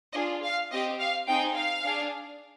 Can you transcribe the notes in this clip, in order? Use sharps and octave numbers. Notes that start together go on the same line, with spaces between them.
D4 F4 G#4 D#5
F5
C4 G4 D#5
F5
C4 D#4 G#4 G5
F5
D4 G#4